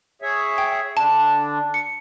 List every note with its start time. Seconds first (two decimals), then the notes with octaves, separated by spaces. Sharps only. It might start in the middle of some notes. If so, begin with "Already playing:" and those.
0.22 G#4 C#5 E5
0.58 G5
0.97 D3 D4 A5
1.74 C#7